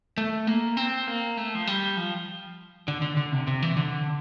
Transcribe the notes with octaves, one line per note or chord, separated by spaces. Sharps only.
A3
A#3
C4
A#3
A3
F3
G3
F3
D3
D3
D3
C3
C3
E3
D3